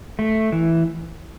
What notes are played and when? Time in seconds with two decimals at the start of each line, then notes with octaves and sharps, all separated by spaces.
0.19 A3
0.52 E3